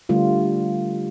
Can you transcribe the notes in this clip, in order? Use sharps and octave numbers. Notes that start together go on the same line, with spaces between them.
D3 G3 A3 F4